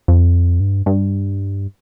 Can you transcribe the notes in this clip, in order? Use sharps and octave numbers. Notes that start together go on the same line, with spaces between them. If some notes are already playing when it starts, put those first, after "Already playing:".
F2
G2
G2